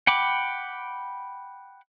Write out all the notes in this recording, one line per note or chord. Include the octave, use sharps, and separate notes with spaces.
F#5 G5 B5 D6